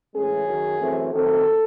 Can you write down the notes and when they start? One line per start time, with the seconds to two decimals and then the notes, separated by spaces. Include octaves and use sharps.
0.14 A2 E3 G#3 C#4 G#4
0.47 F#2 D#3 F#3
0.80 F#2 E3 A3 C4
1.12 F#2 D#3 A3 C4 A4